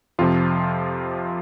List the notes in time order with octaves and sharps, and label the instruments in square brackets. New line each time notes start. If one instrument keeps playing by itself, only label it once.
[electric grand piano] F2 C3 F3 F4